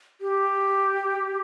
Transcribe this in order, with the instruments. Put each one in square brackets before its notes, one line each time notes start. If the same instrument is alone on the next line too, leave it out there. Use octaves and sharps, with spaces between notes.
[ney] G4